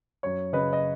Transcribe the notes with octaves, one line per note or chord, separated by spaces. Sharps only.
F#2 C#5
C#3 B4 D#5
D#5